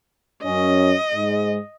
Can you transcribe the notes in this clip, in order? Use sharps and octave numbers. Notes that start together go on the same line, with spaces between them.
F#2 C#4 D#5
G#2 G#3